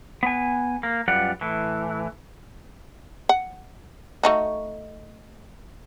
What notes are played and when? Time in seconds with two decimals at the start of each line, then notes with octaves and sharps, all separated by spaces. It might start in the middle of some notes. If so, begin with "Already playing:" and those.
0.23 B3 G#5
0.83 A#3
1.08 F#2 G3 F4 B4 D5 F#5
1.41 A2 E3
3.29 F#5
4.23 A3 D#4 F#4